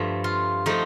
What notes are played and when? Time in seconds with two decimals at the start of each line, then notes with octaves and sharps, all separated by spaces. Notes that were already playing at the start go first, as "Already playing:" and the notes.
Already playing: G2 F3 A3
0.24 F4
0.66 F3 A3 D#4